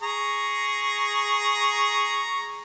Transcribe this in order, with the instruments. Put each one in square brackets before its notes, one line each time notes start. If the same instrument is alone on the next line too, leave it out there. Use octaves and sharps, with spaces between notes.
[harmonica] G#4 A#5 C#6